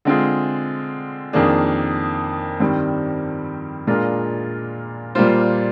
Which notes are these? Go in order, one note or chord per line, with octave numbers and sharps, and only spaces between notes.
D3 G#3 C4 F4 G#4
F2 D#3 A#3 D4 G#4
G2 D#3 G3 C4
A#2 G#3 D4 F4 A#4
A#2 G3 A#3 F4 C5